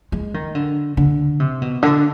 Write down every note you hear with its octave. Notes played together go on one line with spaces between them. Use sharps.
G#3
D#3
D3
D3
C3
B2
D3